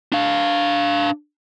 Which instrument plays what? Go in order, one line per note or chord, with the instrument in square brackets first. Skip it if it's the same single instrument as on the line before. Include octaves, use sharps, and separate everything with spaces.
[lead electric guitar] D4 F5